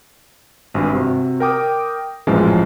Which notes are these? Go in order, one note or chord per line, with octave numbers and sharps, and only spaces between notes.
G#1 G2
C3 F#4
A#4 G5 D6 D#6
A1 F#2 A#2 E3 F3 G#3